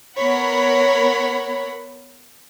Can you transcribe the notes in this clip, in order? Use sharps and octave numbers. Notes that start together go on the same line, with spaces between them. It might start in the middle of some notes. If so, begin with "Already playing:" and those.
B3 A#4 C#5 F#5 B5